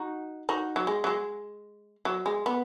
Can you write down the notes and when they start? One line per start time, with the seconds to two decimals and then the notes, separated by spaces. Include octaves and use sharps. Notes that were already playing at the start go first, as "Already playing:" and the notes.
Already playing: D#4 F#4
0.49 D#4 F#4
0.76 F#3
0.87 G#3
1.04 F#3
1.07 G#3
2.05 F#3
2.26 G#3
2.46 B3